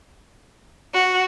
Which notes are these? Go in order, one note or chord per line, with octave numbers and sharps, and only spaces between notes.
F#4